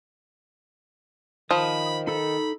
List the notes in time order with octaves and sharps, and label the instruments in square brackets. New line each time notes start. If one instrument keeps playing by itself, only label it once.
[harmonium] D#3 [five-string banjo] F3 [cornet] B5 [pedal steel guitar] D#6
[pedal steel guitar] D#4 A4 [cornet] B5